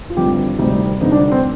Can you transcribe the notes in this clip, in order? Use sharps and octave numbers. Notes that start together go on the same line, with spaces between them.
F4
G#1 G2 D3 F3 G4
D2 C3 D#3 G3 D#4
F1 F2 D3 G3 D#4
D4
C4